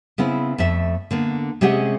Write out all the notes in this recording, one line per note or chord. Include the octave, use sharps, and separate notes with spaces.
C#3 B3 C4 E4
F2 A3 E5
D3 A#3 B3
C3 G#3 C#4 G4 G#4 F#5